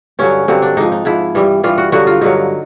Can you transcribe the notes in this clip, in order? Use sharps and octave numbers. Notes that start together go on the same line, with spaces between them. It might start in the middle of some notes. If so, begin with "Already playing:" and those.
G2 D3 F#3 C#4
G2 D3 F#3 C4
D4
G#2 F3 D#4
D#4
G#2 F3 E4
G2 E3 G3
G2 E3 G3 F4
F#4
G2 D3 F#3 F#4
F4
G2 D3 F#3 D#4